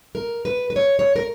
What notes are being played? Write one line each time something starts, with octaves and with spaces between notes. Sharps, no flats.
A#4
B4
B4
C#5
C#5
A#4